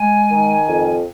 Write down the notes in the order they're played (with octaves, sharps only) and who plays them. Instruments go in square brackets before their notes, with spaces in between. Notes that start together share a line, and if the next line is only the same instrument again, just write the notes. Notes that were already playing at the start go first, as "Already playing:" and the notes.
Already playing: [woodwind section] G#3 G#5
D#3
F2